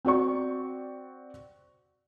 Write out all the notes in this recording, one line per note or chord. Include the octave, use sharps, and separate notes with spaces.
C4 F#4 D5 C#6